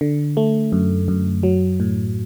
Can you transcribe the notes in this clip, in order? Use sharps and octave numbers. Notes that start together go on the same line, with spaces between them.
D3
A3
F#2
F#2
F#3
A2